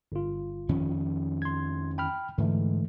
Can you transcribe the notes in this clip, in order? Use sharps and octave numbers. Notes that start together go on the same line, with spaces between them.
G1 F4
F2 D#3 C#4
C6 G#6
G5 B5 F6
G#2 D3 E3 A3